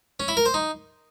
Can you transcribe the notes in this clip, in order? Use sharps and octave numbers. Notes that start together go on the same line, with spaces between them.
C#4
E4
A#4
C5
D#4